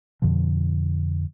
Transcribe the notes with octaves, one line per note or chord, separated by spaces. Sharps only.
F2 B2 D3 F3